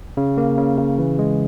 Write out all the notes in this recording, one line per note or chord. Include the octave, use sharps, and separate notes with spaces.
C#3
A#3
C#3
C#3
E3
G#3